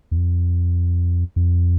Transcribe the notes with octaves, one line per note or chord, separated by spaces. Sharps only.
E2
F2
F2